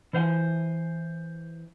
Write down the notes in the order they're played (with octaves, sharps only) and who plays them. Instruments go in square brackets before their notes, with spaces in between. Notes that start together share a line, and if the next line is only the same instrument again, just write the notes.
[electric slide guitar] E3 C5 F5 G#5